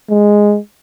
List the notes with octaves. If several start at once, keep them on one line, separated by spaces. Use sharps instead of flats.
G#3